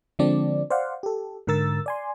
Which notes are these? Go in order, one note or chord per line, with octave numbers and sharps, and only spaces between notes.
D3 F3 G#3 C4 D4 D5
C5 D5 F5 F#5
G4 A4
G#2 D3 A#4 E6 A6
D5 G#5 C6